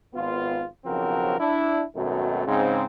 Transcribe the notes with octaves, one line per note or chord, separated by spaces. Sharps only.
G#1 B3 F4
B1 C#3 F3 C4 F#4 A#4
D4 E4
G#1 F#2 B2 D#3 F#3 A3
G#2 C#3 C4